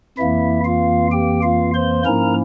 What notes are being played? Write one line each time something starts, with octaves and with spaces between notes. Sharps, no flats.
F2 E3 A#3 E4 E5
F4 F5
G4 G5
F4 F5
C5 C6
G#2 F3 A#3 C#4 E4 A#4 A#5